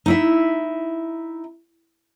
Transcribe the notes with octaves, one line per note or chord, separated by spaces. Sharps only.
D#4 E4 E5